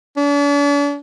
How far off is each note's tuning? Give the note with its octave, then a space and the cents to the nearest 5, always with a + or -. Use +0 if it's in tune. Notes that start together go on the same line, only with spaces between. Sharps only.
D4 -45